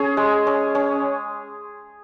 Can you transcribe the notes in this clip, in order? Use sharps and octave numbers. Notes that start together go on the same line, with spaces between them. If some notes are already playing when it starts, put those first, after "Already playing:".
Already playing: C#4 G#4
G#3
C#4
C#4